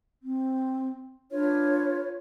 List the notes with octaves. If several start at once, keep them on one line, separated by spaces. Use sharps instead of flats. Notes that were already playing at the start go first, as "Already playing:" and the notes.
C4
D4 F4 B4 C#5